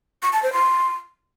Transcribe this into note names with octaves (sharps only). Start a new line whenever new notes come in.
C#6
A5
C5
C6